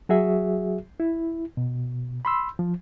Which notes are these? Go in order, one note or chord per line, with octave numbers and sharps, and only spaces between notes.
F#3 F#4 G#4 E5
E4
B2
B5 C6 E6
F3